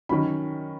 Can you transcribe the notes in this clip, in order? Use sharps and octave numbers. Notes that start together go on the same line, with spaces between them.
D#3 F#3 C#4 B5